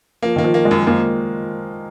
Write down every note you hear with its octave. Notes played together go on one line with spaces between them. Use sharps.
F3 A#3
D#3 A#3
F3
A#3
G#3
F#2
F#2 A#3